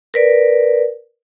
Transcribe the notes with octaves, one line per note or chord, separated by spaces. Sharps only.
A#4 B4 D5